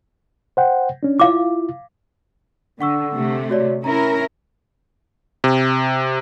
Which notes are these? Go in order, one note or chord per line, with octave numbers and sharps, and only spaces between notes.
C5 F#5 G5
C#4 D4
E4 F4 F5 D6
D3 F#5 C#6 E6
C3 A3
F#4 C#5 D5
C#4 E4 A#4 A#5
C3